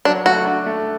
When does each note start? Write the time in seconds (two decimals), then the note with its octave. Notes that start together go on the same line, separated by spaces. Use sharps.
0.05 F#3 D4
0.25 A3 F#4
0.46 D4
0.66 A3